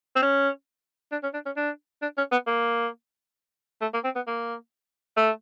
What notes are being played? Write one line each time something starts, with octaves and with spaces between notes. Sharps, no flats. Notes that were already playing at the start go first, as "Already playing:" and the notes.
C4
C#4
D4
C#4
D4
C#4
D4
D4
C#4
B3
A#3
A3
A#3
C4
B3
A#3
A3